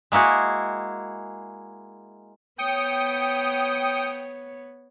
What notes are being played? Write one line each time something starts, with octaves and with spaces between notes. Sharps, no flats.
G#3 A#3 E4 F#4 G#4
B3 C#5 G5 D#6 C#7